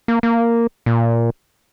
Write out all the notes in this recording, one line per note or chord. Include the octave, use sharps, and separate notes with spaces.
A#3
A#3
A#2